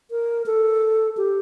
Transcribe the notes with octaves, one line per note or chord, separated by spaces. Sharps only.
A#4
A4
G4